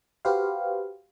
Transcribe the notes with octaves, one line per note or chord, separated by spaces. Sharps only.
F#4 G4 B4 C5 F5